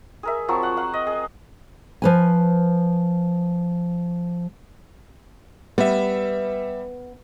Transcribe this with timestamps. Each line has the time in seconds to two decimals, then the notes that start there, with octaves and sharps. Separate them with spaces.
0.23 G#4 A#4 E5
0.48 F3 F#3 C4 C#6
0.63 F#5
0.77 F5 F#5
0.93 D#5
1.07 G#4
2.02 F3 B4 G#5
5.78 G3 B3 E5